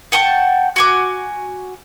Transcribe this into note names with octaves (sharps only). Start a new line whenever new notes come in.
F#5 G5 A5 C#6
F#4 G#5 D6